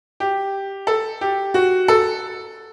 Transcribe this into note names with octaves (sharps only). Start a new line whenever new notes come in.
G4
A4
G4
F#4
A4